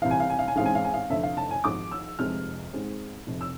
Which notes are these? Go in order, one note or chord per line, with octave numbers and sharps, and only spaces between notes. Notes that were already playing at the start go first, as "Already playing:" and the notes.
C2 C3 E3 F5
G#5
F5
G#5
F5
G#5
A1 G#2 G#3 C4 F5
G#5
F5
G#5
F5
F1 F2 D3 A3 E5
F5
A5
G#5
G#1 G#2 F3 D6
E6
F1 F2 C3 F3 G#3 F6
G#2 G#3 C4
F1 F2 C3
E6